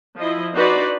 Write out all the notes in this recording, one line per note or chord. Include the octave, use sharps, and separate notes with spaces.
F3 E4 D#5
D4 D#4 F#4 B4 C5 D5